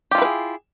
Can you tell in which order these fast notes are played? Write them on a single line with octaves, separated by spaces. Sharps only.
G4 F4 E4 B4 G#4